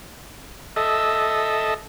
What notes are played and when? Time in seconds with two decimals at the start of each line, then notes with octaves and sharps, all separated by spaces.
0.76 A4 D#5 E5